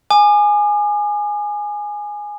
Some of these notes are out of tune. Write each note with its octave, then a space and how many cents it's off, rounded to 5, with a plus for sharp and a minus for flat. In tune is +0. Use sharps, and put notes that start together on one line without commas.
G#5 +0 D6 +45